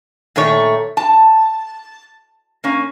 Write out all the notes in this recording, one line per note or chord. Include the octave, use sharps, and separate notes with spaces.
A#2 D#3 A3 C#5
A5
A#3 C#4